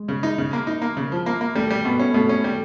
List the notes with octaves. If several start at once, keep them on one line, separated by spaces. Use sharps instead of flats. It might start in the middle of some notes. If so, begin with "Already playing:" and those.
Already playing: G#3
C#3
D#4
C#3
A#3
D#4
A#3
C#3
F3
A#3
A#3
G3 A3
G3
B2 B3
C#4
B2 A3
C#4
G3